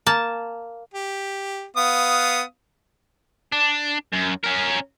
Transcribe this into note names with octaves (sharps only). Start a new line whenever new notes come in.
A#3 A5
G4
B3 F5 D#6
D4
F#2
C#4 A#4